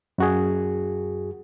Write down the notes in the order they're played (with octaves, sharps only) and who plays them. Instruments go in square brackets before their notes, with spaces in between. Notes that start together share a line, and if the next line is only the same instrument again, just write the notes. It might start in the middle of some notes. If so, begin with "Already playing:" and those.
[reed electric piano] F#2 F#4 G#4